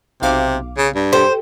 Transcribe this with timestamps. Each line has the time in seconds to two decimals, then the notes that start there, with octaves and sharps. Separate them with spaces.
0.22 B1 C3 F5 D6
0.77 C#3
0.95 G2
1.13 G4 A4 C5 G5